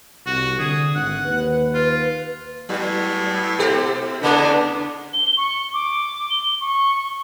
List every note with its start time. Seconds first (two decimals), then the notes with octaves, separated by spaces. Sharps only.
0.26 C2 F#4
0.59 D3 G#4
0.95 G#1 F#5
1.25 D#2 B4
1.74 F4
2.69 A2 F#3 B3
3.58 B2 G4 A4
4.23 E2 C#3 B3 D4
5.13 G7
5.37 C#6
5.74 D6
6.30 G7
6.61 C#6